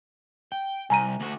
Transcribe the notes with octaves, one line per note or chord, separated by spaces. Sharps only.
G5
C2 G#5 A#5 D#7
D2 F#4